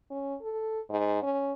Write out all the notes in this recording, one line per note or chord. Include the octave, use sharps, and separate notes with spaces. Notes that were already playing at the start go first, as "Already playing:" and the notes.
C#4
A4
G#2
C#4